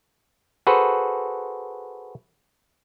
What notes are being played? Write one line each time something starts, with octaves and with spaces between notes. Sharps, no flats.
F#4 G#4 A4 B4 C5